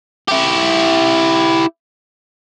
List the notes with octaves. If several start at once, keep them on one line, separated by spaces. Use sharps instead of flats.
E4 G4